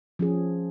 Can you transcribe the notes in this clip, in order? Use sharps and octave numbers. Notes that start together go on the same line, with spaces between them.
F3 C#4 G#4